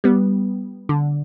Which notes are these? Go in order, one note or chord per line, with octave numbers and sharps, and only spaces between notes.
G3 B3
D3